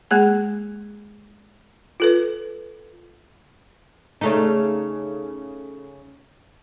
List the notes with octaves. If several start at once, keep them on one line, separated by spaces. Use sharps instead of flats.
G#3 A#3 G#4 G#5
F4 A4 B4
C#3 A3 D#4